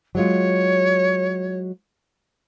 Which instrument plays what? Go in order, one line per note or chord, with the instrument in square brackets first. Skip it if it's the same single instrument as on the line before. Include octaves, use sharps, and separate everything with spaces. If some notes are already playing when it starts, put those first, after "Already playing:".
[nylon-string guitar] F#3 G#3 F4 [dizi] C#5